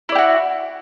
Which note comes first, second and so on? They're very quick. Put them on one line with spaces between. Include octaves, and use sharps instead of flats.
E4 D5 G4 F#4